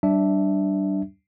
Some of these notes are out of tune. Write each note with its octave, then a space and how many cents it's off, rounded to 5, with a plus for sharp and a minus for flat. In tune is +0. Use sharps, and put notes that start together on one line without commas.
G3 -35 D4 +0 E5 -5